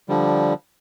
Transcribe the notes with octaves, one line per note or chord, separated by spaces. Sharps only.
D3 F3 G3